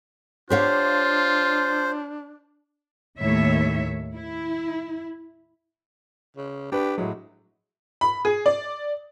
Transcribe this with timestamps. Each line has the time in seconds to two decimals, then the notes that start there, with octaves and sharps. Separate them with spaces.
0.50 D4 F4 G4 C5 C#5 F5
3.19 D#2 A2 D#3 C#5 E5
4.16 E4
6.37 C#3
6.72 D4 G4 B4
6.98 A2 F#3 G#3
8.01 B5
8.25 G#4
8.46 D5